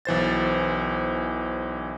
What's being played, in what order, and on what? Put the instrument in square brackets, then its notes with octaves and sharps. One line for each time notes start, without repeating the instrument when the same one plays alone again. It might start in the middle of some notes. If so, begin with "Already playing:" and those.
[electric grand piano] B1 E3 C5 A6